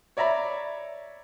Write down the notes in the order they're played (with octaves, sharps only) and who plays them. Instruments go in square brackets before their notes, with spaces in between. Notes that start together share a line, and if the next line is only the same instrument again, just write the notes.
[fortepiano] C#5 D5 E5 A#5 B5